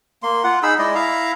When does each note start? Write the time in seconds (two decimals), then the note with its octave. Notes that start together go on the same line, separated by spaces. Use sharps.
0.23 A#3 C6
0.44 F4 F#5
0.63 D#4 G#4 B5 E6
0.79 G#3 E4 D5 D#5
0.95 E4 E5 F5 A#5